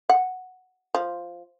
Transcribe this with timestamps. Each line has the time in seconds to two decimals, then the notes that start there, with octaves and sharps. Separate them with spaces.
0.09 F#5
0.95 F3